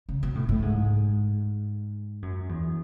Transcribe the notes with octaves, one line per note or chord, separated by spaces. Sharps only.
C#3
B2
A2
A2
G#2
F#2
E2